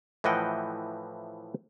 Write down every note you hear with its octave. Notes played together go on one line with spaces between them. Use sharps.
A2 E3 F3 D#5 F#5 G5